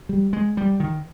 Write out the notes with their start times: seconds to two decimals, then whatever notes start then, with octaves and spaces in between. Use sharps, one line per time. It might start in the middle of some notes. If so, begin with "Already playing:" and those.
0.09 G3
0.33 G#3
0.57 G3
0.80 D#3